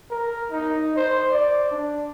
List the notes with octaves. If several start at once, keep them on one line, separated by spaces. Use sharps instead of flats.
A#4
D#4
C5
D5
D4